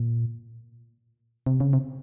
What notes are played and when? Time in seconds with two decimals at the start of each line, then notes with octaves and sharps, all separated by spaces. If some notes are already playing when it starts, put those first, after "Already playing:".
Already playing: A#2
1.46 C3
1.60 C#3
1.73 C3